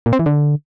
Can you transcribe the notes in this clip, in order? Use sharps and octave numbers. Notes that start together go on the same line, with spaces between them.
A#2
C4
E3
D3